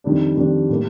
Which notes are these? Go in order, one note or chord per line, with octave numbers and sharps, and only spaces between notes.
F2 D#3 G3 D4
F2 D#3 G3 D4
A2 G3 A#3